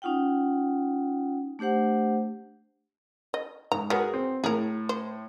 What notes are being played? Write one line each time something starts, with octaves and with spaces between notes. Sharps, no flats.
C#4 D#4 F4 F#5 G5
A3 D4 G4 C5 F#5
D#5
G#2 A#5
F#3 B3 G#4 A#4 F#5
C4
A2 G#4 A#4
C5